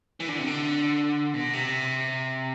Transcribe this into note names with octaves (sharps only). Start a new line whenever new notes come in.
E3
D3
C3
D3
B2
C3